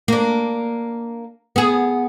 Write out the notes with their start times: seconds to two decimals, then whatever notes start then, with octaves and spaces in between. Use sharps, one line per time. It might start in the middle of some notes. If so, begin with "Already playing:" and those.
0.08 A#3 D4
1.56 B3 G#4